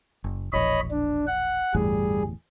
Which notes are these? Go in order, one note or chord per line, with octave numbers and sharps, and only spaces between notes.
F#1
E1 A#1 C#5 D#5 B5
D4
F#5
G1 E2 A2 G3 G#4